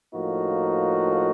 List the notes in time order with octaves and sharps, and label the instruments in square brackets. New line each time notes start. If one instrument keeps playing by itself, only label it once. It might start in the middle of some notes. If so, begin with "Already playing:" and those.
[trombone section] A2 F3 A#3 D#4 F#4